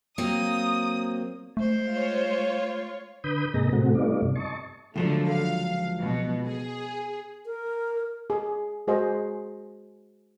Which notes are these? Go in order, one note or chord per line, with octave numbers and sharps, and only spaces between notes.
F#3 A#3 C4 D#6
G#3 A3 C5
F4 C#5
D3 B4 B5 D#6 G6
G#2 C3 A#3 G#4 D#5 A#5
A2 C3 A3 C4 F#4
G3 A3 B3 D#4 F4 D5
G2 C3
D#5 A5 C#6
C#2 D3 F3 F#3 A3
F5
B2
G#4
A#4
G#4
G#3 F#4 G#4 C5 D#5